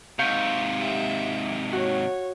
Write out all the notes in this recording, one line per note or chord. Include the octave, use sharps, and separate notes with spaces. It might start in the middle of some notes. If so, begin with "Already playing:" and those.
G#2 C3 F5 C#6 G6
G4 E5
F#4 C#5